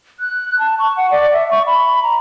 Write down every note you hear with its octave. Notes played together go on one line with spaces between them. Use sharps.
F#6
A5
C#6
F#5
D5
E5
C#6
B5
A#5